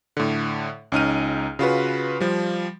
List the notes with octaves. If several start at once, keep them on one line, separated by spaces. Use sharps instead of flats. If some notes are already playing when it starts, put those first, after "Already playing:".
A2 D3
C#2 C#4 D#4 A#5 F6 D#7
C#3 F4 F#4 B4
F3 G3